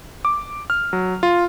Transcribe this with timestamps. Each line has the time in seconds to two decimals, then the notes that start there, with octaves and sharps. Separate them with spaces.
0.25 D6
0.70 F6
0.93 F#3
1.23 F4